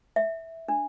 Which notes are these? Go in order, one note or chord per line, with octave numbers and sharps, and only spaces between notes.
E5
D4